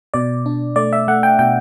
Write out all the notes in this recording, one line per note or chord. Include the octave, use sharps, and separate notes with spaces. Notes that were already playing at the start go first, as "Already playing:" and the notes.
B2 D5
D4
A3 D5
E5
A3 F#5
G5
B2 G5